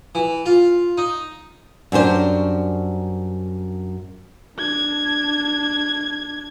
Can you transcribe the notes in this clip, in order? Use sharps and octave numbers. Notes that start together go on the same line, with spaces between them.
E3
F4
D#4
F#2 G3 D4 C5
D4 G#6